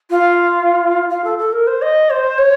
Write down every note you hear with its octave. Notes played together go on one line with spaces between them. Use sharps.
F4
F4
A4
A4
A#4
C5
D#5
C5
C#5